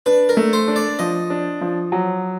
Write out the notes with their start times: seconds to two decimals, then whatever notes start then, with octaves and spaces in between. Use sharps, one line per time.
0.06 D4 B4
0.29 A#4
0.37 A3
0.53 C5
0.68 D4
0.76 D5
0.99 F3 D#5
1.30 D4
1.61 F3
1.92 F#3